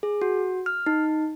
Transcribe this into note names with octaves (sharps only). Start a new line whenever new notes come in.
G#4
F#4
F6
D#4